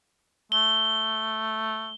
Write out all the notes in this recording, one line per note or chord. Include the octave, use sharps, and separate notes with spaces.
A3 G7